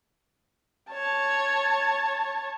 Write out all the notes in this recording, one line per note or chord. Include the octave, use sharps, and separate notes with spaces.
C#5 A5